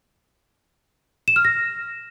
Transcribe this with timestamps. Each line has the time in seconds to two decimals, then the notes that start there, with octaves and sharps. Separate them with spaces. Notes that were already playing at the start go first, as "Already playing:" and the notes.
1.28 E7
1.36 F6
1.45 A#6